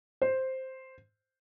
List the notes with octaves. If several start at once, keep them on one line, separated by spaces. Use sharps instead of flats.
C5